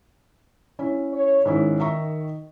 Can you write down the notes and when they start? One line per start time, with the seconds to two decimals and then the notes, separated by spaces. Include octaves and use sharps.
0.79 C#4 E4
1.13 C#5
1.45 G#2 D#3 C#4 E4
1.80 E5 A#5 C#6